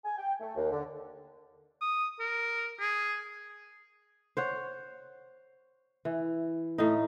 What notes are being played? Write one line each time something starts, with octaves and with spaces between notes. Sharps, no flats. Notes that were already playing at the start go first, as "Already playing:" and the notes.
G#5
G5
A3
D#2
D3
D#6
A#4
G#4
C5 C#5 F#5
E3
A2 D#4